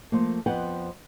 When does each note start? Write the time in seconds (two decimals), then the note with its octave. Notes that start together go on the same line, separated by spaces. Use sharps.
0.12 F3 A3 A#3
0.46 F2 F3 B3 B4 F#5 G5